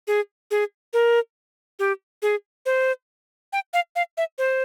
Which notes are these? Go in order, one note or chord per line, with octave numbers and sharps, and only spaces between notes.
G#4
G#4
A#4
G4
G#4
C5
G5
F5
F5
E5
C5